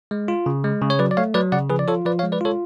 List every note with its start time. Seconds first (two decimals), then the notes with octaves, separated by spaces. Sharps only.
0.11 G#3
0.28 F4
0.46 C#3
0.64 G#3
0.82 C#3
0.90 C#5
0.99 F#3 B4 D5
1.11 D5
1.17 A3 C#5 F5
1.34 F#3 B4 D5
1.52 C#3 D5 F#5
1.70 F3 G#4 B4
1.79 D5
1.88 F4 A4 C#5
2.05 F3 B4 D5
2.19 C#5 F5
2.23 G#3
2.32 B4 D5
2.41 F4 A4 C#5